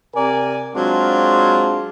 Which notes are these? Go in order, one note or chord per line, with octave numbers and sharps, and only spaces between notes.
C3 A#4 D5 G#5
F#3 G#3 C4 D4 F4